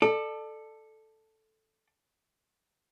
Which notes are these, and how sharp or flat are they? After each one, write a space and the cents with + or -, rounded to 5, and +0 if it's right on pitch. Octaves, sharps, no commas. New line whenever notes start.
A4 +0 D5 +30